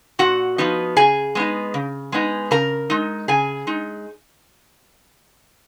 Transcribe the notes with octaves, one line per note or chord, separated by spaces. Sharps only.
A#2 F#4 F#5
F3 B3 D#4
C#3 G#4 G#5
G#3 B3 D#4
C#3
G#3 B3 D#4
C#3 A#4 A#5
G#3 D#4
C#3 G#4 G#5
G#3 D#4